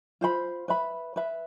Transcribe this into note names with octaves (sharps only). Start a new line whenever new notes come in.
F4 C5 G5 B5
B4 E5 B5
B4 E5 B5